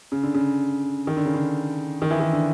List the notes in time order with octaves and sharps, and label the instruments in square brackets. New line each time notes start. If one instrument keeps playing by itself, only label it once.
[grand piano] C#3
D3
C#3
D#3
D3
C#3
D3
D#3
E3
D#3
D3